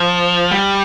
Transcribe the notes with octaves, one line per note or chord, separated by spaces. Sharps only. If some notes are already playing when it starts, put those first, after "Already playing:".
Already playing: F3
G3